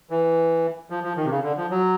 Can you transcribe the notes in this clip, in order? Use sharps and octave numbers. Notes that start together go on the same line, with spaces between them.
E3
F3
F3
D#3
C3
C#3
D3
F3
F#3